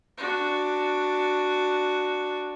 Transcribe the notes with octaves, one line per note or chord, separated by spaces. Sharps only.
D4 F#4